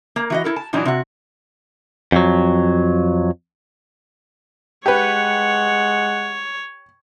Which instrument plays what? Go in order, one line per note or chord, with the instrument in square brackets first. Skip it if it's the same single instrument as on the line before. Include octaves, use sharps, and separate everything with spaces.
[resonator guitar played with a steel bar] A#3
E3 F#4 D#5
E4 A4 A#4
A5
A#2 E3 F#3 D4 D#4
C3 F#4
[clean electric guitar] F2 F#3
[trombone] G#3 [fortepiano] G4 B4 [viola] C#5 [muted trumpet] F#5